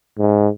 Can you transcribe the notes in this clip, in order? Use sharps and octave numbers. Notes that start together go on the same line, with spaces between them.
G#2